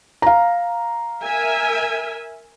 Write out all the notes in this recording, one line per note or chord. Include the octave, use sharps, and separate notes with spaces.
F5 A#5
A#4 E5 G#5